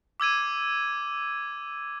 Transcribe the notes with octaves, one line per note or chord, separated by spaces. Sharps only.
D6 E6 G#6 D#7